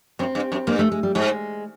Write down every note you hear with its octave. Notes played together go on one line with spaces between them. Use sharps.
F#2 C4
G2
F#2
G2 A#3
A3
G#3
G3
G#2 G#3